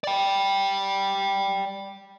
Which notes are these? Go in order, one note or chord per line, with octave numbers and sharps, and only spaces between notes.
D5 G5